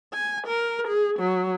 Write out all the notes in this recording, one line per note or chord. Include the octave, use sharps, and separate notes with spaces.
G#5
A#4
G#4
F#3